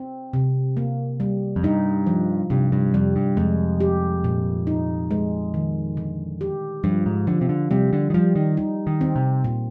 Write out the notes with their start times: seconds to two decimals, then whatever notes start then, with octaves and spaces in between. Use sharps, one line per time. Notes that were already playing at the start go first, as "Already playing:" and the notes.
Already playing: C4
0.33 C3
0.77 A#3
1.20 G3
1.56 F2
1.63 G2 D#4
2.07 F3
2.50 G2 C3
2.72 G2
2.94 F2 G3
3.16 G2
3.37 F2 G#3
3.80 G4
4.24 A#2
4.67 D#4
5.11 G#3
5.54 D#3
5.97 D3
6.41 G4
6.84 G2 F3
7.06 G#2
7.27 D3 F3
7.41 C3
7.49 D3
7.71 C3 G3
7.93 D3
8.10 D#3
8.14 F3 G3
8.36 D#3
8.57 D#4
8.87 D#3
9.01 C4
9.16 C3
9.44 A#2